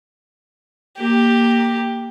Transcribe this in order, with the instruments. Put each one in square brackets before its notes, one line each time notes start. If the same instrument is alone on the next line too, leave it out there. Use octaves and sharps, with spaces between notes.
[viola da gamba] A#3 [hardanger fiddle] G4